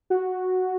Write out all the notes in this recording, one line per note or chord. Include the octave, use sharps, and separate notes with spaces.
F#4